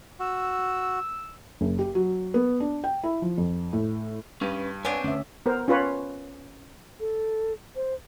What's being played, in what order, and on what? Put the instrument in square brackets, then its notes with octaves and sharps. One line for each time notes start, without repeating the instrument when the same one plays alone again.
[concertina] F#4 [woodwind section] E6
[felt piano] F#1
G4
F#3
B3
D4
G5
E4
F3
F2
A2
[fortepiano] G2 [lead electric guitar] C#4 B4
[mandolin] B3 C4 D4 [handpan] C#5 [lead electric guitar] G#5
[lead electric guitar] D2 [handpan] C#4 E5
[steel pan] B3 A#4 C5
C#4 F4 B4 C#5
[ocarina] A4
C5